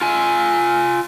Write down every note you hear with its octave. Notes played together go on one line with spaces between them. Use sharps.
F4 G#5